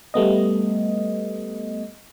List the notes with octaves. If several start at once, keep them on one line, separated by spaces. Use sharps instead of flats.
G3 A3 B3 D#5